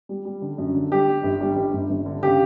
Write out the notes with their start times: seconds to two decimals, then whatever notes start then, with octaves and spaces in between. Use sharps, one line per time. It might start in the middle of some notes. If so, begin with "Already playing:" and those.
0.09 G3
0.25 G3
0.42 D3
0.58 F#2
0.75 D3
0.92 G3 G4
1.07 G3
1.23 G1
1.41 G3
1.56 G1
1.73 G1
1.90 G1
2.06 D3
2.23 C#3 G4